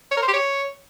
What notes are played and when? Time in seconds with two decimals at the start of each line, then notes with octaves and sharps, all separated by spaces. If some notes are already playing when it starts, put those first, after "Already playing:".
0.11 C#5
0.17 A#4
0.23 C5
0.28 G4
0.34 C#5